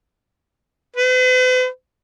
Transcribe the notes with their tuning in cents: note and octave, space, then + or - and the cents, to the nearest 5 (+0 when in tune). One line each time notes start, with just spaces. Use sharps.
B4 +45